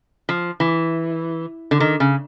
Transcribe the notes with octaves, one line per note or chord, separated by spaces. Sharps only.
F3
E3
D3
D#3
C#3